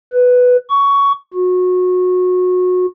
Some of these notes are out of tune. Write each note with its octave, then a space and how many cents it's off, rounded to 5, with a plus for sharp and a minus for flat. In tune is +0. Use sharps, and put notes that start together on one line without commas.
B4 +5
C#6 +15
F#4 -25